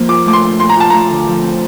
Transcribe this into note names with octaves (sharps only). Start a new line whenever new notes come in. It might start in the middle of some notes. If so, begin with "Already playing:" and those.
Already playing: F3 A#3
F4 D6
A3 D6
C6
D4
A#2 C6
A#5
F4 A5
A3 A#5
D3
F3
C4